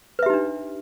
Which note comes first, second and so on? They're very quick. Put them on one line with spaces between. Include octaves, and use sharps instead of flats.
B4 E5 G4 D#4 D4